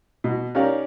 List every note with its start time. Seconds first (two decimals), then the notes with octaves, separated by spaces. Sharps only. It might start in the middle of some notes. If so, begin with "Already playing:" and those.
0.24 B2
0.55 C#4 D#4 G4 A#4 D5 F5